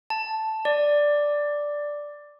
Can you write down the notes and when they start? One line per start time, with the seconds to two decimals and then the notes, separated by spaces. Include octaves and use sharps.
0.10 A5
0.65 D5